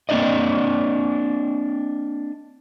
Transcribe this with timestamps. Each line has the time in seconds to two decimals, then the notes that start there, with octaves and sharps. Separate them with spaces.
0.09 A#3 C4 D4 D5 D#5